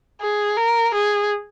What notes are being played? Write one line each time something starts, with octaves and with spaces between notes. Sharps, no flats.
G#4
A#4
G#4